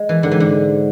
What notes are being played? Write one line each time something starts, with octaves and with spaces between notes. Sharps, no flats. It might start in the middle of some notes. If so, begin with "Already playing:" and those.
Already playing: G#3
E3
G#2 D3
E3
D3